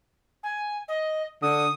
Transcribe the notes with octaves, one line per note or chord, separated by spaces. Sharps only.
G#5
D#5
D3 D#6